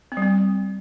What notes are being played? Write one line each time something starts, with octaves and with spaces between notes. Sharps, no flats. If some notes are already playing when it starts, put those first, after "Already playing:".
C4
G3
C4